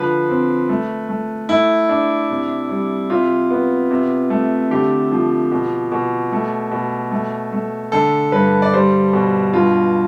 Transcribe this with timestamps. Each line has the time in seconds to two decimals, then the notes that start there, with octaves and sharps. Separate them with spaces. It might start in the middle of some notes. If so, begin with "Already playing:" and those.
Already playing: D3 F3 B4
0.29 C4
0.69 A3
1.09 A3
1.49 A3 E4
1.89 D4
2.30 C3
2.69 G3
3.10 C3 F4
3.51 B3
3.91 C3
4.30 A3
4.71 D3 G4
5.12 F3
5.51 B2
5.92 B2
6.32 A3
6.71 B2
7.11 A3
7.52 A3
7.92 D3 A4
8.32 G2 B4
8.62 D5
8.73 G3 C5
9.13 B2
9.53 G2 F4